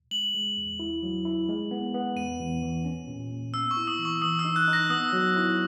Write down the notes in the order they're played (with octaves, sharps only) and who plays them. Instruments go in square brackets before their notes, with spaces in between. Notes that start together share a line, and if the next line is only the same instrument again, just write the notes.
[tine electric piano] G#3 [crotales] F#7
[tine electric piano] G#3
E2
E4
F#3
E4
G#3
B3
B3
[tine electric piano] E2 [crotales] D#7
[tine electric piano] E2
E3
C#4
A#2
A#3
[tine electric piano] B3 [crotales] E6
[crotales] C#6
[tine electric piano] E4
[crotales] D#6
[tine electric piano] E3
[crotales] C#6
[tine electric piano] E3 [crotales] D#6
[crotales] E6
[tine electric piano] D#4
[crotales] F#6
[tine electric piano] D#4
[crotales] A#6
[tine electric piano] B3 [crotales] D#6
[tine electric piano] F#3
E4